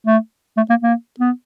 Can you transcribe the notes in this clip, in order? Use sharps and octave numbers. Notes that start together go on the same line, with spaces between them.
A3
A3
A#3
A#3
B3